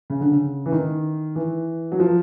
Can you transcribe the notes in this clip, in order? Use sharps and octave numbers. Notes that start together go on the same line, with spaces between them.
C#3
D3
C#3
E3
D#3
E3
F#3
F3